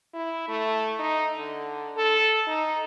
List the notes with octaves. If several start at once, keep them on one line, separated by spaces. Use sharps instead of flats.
E4
A3
D#4
D3
A4
D#4